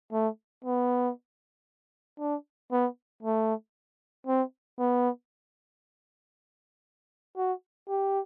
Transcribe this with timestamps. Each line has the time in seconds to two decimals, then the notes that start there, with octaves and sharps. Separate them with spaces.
0.13 A3
0.64 B3
2.20 D4
2.72 B3
3.23 A3
4.27 C4
4.78 B3
7.37 F#4
7.88 G4